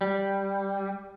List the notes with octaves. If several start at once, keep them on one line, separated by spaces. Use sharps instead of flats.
G3